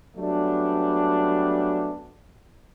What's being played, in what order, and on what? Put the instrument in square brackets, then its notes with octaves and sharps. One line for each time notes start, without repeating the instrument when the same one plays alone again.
[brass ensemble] F#3 G3 A3 B3 C#4 D4